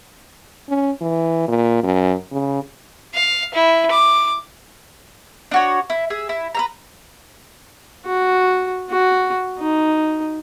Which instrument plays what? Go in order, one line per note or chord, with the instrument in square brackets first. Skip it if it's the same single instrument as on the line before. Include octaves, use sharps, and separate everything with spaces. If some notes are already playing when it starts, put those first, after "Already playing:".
[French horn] C#4
E3
A#2
F#2
C#3
[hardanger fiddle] F5
E4
D6
[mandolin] D4 F#4 C#5
E4
G#4 E5
E4
B4 E5 A#5
[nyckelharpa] F#4
F#4
D#4